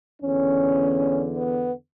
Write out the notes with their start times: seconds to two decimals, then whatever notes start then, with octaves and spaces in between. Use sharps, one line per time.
0.22 E2 D3 C#4
1.38 B3